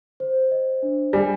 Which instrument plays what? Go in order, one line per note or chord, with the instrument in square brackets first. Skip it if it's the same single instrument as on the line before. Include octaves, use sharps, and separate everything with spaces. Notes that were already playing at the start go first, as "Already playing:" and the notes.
[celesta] C5
D#5
D4
[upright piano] G3 [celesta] G#5